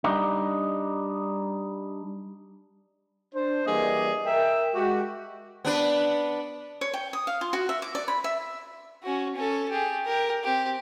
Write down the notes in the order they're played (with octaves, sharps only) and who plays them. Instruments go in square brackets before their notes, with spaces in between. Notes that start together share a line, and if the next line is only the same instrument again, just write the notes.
[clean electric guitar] G3 D4 D#4
[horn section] D4 C5
E3 G3 A#3 G#4 D5 D#5
A#4 E5 G5
G#3 F#4 G4
[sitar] B3 D4 B4
[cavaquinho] C#5
G5
D#6
F5
F4
F#4
E5
D6
D5
B5
E5
[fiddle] C#4 F#4
C#4 A4
G4 G#4
G4 A#4
C4 G4